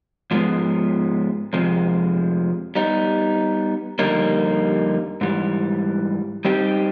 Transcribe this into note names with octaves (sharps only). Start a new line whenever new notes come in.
G#2 F3 G#3 B3
F2 C3 F3 G#3
G3 B3 D#4
F2 D3 G3 A#3 D#4
G#2 E3 G3
G3 C4 D#4 G4